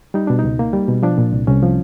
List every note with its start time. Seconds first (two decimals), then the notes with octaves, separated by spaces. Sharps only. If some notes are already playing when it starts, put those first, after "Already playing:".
0.14 G3 D#4
0.27 B2 D4
0.39 C#2 D#4
0.59 A#3
0.73 G3
0.88 B2
1.03 F3 D4
1.18 A#2
1.33 C2
1.47 C2 C#4
1.63 F3